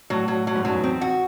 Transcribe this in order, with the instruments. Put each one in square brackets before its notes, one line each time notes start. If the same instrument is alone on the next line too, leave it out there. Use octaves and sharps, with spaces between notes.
[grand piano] A2 [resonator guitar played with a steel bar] F#3
[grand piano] A2 [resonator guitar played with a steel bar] F#3
[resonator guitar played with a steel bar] F#3
[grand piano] G#2
[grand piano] F#2 [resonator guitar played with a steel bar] F#3
[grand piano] E2
[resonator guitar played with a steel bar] C4
F#4